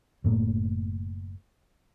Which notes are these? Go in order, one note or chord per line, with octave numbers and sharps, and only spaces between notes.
F#1 A2 A3 A#3